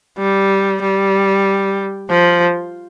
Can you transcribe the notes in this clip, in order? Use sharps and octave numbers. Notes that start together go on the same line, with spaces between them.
G3
G3
F3